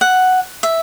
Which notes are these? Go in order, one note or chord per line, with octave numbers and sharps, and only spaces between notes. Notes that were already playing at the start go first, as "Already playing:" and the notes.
F#5
E5